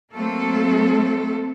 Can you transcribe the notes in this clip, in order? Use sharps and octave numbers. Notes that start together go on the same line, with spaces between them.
F#3 A3 A#3 C4 A4